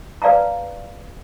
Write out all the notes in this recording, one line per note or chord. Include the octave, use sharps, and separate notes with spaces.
B4 D5 F5 A5 A#5